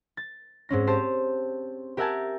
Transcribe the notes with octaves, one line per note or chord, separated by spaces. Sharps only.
A6
G#2 C4 C#4 A#6
G4 C5 A5
G4 A#4 E5 F#5 G#5 A5